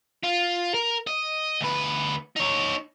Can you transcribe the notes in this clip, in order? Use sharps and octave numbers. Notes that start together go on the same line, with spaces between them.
F4
A#4
D#5
D2 B4
D#4 C#5